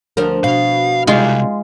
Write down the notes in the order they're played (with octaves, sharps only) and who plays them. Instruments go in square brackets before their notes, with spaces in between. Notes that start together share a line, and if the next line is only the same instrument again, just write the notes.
[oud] D2 F3 A#4
[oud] B2 [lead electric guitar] F5
[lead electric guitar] C2 G3 [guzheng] G#3 F4